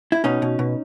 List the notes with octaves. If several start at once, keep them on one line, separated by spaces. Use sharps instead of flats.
E4
B2 C#4 D#4
B2
B2